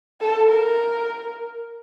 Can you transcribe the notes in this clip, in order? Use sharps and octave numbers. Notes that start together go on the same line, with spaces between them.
A4
A#4